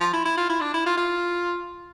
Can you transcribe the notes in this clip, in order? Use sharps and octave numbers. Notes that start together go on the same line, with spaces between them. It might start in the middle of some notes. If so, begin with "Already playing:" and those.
F3
E4
E4
F4
E4
D4
E4
F4
F4